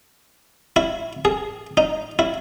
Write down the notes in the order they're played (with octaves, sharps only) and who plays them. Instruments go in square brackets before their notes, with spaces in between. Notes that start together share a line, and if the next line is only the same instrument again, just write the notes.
[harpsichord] E4
G#4
D#4
E4